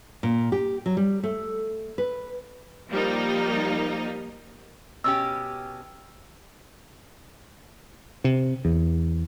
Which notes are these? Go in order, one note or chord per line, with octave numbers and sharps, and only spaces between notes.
A#2
G4
F#3
G3
A3
B4
F3 G3 A#3 D#4
B2 C#4 G4 E6
C3
E2